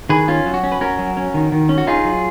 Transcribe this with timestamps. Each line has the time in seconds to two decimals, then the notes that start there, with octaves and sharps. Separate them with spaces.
0.09 D#3 G#4 B4
0.28 C#4 F4
0.46 F#3
0.54 F#4
0.63 C#4
0.72 B4
0.81 C#4 F#4 A#4
0.99 F#3
1.17 C#4
1.34 D#3
1.52 D#3
1.69 C#4
1.78 F#4
1.87 D#4 F4 G#4
2.05 F#3